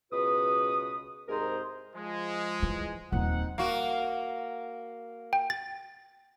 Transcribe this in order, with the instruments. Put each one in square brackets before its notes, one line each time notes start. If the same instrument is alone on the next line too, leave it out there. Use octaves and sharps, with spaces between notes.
[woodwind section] C#2 B2 F#4 B4 D#6
C2 G#2 G#4 A#4 C5 A#5
[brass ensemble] F3 G#3
[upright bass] E3
[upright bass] D#1 E3 [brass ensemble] C4 D#4 F#5
[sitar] A#3 F#4
[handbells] G5
A6